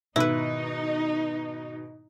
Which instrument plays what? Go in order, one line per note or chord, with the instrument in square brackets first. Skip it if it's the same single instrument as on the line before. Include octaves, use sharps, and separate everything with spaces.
[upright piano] G#2 B2 D#3 [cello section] D#4 [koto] E4 B4